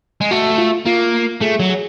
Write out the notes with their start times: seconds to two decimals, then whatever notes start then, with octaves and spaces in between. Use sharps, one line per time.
0.21 G#3
0.31 A3 F#4
0.58 F4
0.86 A#3 F4
1.41 A3 G#4
1.60 F#3
1.69 G#4